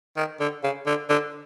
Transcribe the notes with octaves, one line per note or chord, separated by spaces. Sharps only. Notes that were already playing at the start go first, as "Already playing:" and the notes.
D#3
D3
C#3
D3
D3